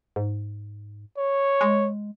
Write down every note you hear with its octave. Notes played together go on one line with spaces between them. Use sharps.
G#2
C#5
G#3